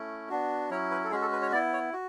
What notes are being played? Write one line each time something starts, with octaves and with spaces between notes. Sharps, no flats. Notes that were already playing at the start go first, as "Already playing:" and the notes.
Already playing: A3 C#4 E4
B3 D4 F#4
F#3 C#4 E4 C#5
B4
A4
G#3 C#4 F#4 G#4
A4
B4
C#5
B3 E4 D5
C#5
F#4